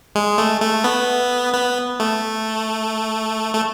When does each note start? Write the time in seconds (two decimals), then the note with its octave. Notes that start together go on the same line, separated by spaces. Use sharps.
0.15 G#3
0.38 A3
0.61 A3
0.84 B3
1.54 B3
2.00 A3
3.55 A3